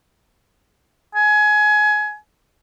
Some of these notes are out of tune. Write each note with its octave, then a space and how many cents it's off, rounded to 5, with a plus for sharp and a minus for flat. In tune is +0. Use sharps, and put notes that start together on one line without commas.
G#5 +25